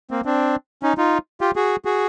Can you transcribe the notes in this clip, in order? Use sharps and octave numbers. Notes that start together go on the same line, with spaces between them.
A#3 C4
C4 D4
C#4 D#4
D#4 F4
F4 G4
F#4 G#4
F#4 G#4